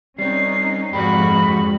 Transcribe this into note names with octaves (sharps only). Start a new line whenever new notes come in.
G3 C4 C#4 D#4 C7
F2 G#2 G#3 F#4 G4 B5